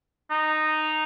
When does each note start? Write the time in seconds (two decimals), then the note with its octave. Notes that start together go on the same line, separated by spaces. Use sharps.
0.31 D#4